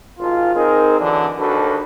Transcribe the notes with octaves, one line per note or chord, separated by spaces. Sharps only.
G#1 F4
C4 D#4 G#4 A#4
D3 E3 F#3 D4
D#2 D4 F#4 A4 B4